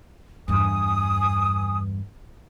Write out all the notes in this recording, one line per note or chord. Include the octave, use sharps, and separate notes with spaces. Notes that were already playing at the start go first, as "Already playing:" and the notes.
E2 G2 G#5 D#6